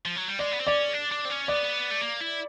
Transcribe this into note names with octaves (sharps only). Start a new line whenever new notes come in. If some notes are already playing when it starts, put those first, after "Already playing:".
F3
F#3
G3
G#3 D5
B3
C4
C#4 D5
D4
D4
C4
C#4
B3 D5
A3
A#3
E4